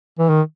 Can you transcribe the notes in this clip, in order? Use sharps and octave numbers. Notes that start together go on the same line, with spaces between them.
E3
D#3